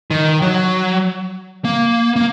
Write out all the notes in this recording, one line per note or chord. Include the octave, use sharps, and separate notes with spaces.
D#3
F#3
A#3
A#3